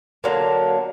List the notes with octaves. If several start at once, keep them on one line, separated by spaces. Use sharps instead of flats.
D3 F#3 A#3